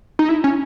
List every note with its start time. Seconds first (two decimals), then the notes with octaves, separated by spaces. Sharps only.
0.19 D#4
0.29 E4
0.44 C#4